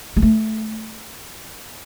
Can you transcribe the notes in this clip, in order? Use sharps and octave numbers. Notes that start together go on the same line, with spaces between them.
G#3
A3